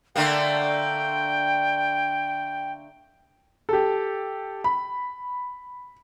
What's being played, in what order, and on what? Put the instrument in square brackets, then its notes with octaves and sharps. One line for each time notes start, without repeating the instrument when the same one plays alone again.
[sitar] D3 A3 A#3 [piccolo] G5
[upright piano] G4 A4
B5